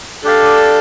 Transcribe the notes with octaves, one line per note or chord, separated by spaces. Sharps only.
D4 G4 A4 D5 F5